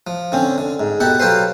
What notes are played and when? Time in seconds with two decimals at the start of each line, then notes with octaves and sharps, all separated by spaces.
0.07 F3
0.32 D3 C4 C#4
0.58 D3
0.80 G#2
1.00 B2 G4 A4 F#5
1.20 F#3 F4 G4 A4 B4 C5